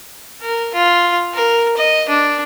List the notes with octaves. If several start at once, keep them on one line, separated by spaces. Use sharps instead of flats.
A#4
F4
A#4
D#5
D4